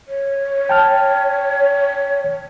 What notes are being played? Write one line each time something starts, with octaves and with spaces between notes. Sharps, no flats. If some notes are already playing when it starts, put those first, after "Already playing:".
C#5
G5 A5 F6